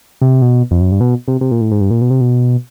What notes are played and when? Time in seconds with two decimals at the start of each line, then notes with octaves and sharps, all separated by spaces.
0.21 C3
0.42 B2
0.71 F2
0.81 F#2
0.92 G2
1.01 B2
1.28 C3
1.41 C3
1.51 A#2
1.61 A2
1.71 G#2
1.81 G2
1.91 A#2
2.02 B2
2.11 C3
2.21 B2